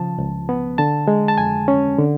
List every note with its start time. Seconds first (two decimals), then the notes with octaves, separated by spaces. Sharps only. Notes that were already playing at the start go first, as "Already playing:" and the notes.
Already playing: C#3 F3 A5
0.18 C#2
0.49 B3
0.78 D3 A5
1.08 G#3
1.28 A5
1.38 F2 G#5
1.68 C#4
1.98 D3